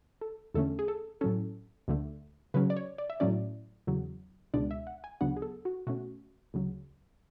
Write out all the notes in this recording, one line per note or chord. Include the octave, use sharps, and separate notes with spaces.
A4
E2 D3 A3 C#4 A4
G#4
A4
A2 F#3 C#4 A4
D2 D3 A3
C#3 F#3 C#4 B4
D5
C#5
D5
E5
A2 F#3 A3 C#4 D5
E2 C#3 F#3
C#2 B2 G#3 D4 D5
E5
F#5
G#5
D2 C#3 F#3 B3 D4 F#5
G#4
A4
F#4
B2 A3 C#4 F#4
D2 C#3 F#3